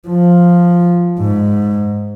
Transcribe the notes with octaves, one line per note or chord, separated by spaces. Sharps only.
F3
G#2